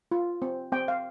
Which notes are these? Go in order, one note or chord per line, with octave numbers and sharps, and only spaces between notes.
F4
C4
C4 G5
F5